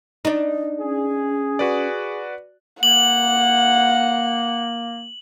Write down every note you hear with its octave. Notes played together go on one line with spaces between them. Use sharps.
D4 D#4
C#4 G#4
F#4 B4 D5
A#3 F#5 F#7